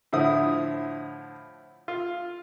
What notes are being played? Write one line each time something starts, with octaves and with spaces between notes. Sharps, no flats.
A2 D3 F3 E4 D#6
F4